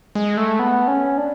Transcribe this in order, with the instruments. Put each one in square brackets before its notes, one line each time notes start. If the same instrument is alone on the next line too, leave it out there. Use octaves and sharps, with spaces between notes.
[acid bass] G#3
A3
B3
C#4
D4